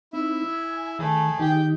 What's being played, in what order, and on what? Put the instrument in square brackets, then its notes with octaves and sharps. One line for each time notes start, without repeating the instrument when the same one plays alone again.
[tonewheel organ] C4 D#4 [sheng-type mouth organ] E4 E5
[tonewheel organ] G#5
[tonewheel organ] D#3 [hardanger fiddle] A3 [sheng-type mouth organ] G#4
[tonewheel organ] D#3 D#4 [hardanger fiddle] G4 G5